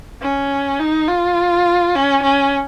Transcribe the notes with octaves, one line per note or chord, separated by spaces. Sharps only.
C#4
D#4
F4
C#4
C#4